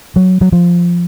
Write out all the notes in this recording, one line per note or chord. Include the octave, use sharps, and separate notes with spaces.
F#3
F#3
F3